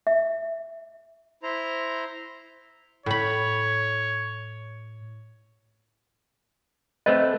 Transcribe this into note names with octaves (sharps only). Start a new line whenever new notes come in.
E5
E4 C5 A#5
A2 C#5 B5
A3 C4 B4 D#5